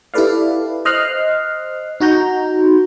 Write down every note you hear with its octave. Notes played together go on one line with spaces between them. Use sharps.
E4 G4 A4 B4 D5 F5
C5 D#5 F6 F#6 C7
D#4 F#4 A#5 G6